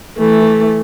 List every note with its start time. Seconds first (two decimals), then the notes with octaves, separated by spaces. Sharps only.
0.18 E3 A3